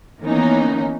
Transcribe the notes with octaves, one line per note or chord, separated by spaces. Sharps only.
D#3 E3 A#3 B3 C#4 D#4